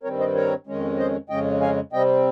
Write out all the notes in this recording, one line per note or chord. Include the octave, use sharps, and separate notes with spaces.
G2 D#3 G3 C4 A#4 C#5
C5 D#5
A#4 C#5
F2 D#3 G#3 C#4
C5 D#5
F2 C#3 G#3 C#4 D#5 G5
F5 G#5
C3 G3 C4 D#5 G5